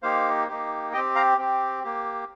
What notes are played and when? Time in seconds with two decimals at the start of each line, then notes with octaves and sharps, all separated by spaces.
0.03 A#3 D#4 G4 C5 F5
0.48 A#3 D#4 G4
0.93 G4 D#5 G5
0.96 C4
1.15 F5 A#5
1.38 C4 G4
1.84 A#3 G4